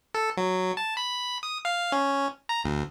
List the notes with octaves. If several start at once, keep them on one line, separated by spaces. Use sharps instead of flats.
A4
F#3
A5
B5
D#6
F5
C#4
A#5
D2